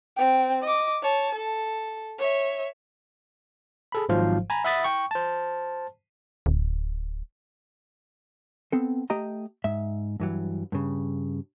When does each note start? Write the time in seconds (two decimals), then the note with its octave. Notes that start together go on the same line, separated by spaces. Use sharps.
0.17 C4 G5
0.63 D#5 D6
1.02 C#5 A5
1.35 A4
2.19 C#5 E5
3.92 G#4 A4 B5
4.09 G#1 G#2 F3 F#3 C5 F5
4.50 G#5 A#5 B5
4.65 E5 F#5 B5 D#6 A6 B6
4.84 G5 C#6
5.11 C5 A5
6.46 D1
8.72 B3 C4 A4
9.10 A3 G4 D#5 A#5
9.64 G#2 E5
10.20 G2 E3 F#3
10.72 G2 C#3